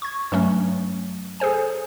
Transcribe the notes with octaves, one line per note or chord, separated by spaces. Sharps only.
C#6 G#6
G2 F#3 A3 C#4
G#4 A4 C5 G#5